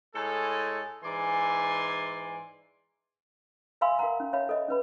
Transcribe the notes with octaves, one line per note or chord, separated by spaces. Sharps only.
A2 G#3 A4
G#2 E3 D5 G#5 C6
E5 F5 G#5 B5 C6 E6
A#4 F5 F#5 A#5
C#4
C#5 E5 F5 G5 B5
A4 D#5 E5
C#4 B4 B5